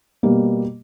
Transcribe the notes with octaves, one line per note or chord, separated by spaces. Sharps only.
B2 G3 A#3